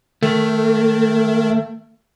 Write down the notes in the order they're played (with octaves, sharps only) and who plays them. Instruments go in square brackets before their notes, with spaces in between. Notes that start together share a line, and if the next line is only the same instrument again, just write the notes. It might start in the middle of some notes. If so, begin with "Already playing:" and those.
[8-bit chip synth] D#3 [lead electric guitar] A3